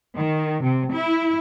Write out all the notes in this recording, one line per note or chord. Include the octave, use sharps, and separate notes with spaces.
D#3
C3
E4